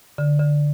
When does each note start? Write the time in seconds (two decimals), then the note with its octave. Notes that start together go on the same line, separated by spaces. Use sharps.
0.18 D3
0.40 D3